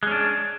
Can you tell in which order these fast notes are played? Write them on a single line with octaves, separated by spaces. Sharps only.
G#3 C#4 D4